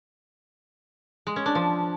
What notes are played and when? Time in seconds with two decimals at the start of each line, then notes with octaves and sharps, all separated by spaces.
1.27 G#3
1.36 C#4
1.46 D4
1.55 F3